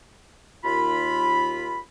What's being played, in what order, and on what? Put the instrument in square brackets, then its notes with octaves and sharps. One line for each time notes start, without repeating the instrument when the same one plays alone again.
[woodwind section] D#2 F4 B5